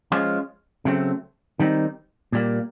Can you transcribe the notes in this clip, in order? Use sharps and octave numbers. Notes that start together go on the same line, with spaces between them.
F3 G#3 C#4 F4
C#3 F#3 A3 C4
D#3 G3 C4 D#4
A#2 G3 A#3